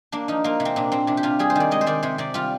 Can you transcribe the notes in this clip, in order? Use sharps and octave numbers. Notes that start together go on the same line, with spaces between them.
A#3 D4
F3 D#4
A#3 F4
C3
C4
A#2 D4
A#2 C4
C3 D4
G4
C3 F4
G3 G#4
C5
D#3 D5
G#3 D#5
C5
D#3 D5
C3 C5
C3 D5
G3 F4